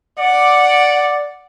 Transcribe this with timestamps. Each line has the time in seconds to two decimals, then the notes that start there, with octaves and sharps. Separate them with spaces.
0.19 D5 F#5